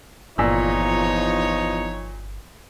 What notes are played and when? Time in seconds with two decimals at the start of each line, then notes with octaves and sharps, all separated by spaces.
0.38 G1 E2 A#2 F3 D#4 C#5 D5 E6